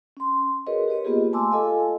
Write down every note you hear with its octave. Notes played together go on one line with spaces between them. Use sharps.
C#4 C6
F#4 G#4 A#4 B4 C#5 D#5
G4 B4 C#5 D#5
A#3 B3 F4 G4 G#4
A3 G#5 A5 C6 D6 E6
F4 A4 D#5 F5 G#5